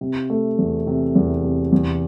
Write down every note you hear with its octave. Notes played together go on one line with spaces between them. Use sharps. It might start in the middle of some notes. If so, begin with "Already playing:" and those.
C3
A3
E2
C3
E2
C3
E2